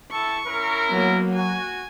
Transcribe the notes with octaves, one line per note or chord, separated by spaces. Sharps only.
E4 A4 C#6
C#4 E4 A#4
F#3 A#3 B3
F#4 G#5